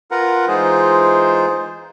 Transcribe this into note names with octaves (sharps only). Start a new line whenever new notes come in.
F4 A#4 B4 F#5 A#5
E3 G#3 D#4 F4 G#4 C5